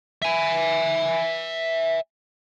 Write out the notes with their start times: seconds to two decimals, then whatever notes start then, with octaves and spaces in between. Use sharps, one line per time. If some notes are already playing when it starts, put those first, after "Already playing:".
0.22 E5 G#5